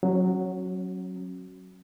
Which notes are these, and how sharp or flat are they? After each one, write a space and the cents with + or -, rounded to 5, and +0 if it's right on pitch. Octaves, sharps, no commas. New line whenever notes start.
F#3 +0 C#4 -30